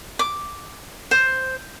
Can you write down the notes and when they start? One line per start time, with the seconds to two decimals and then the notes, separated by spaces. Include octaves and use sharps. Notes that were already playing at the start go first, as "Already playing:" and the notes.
0.19 D6
1.11 C5